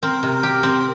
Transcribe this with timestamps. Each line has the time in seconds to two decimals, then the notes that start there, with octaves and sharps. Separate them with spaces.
0.03 C4 A#4
0.23 C3
0.43 G4
0.63 C4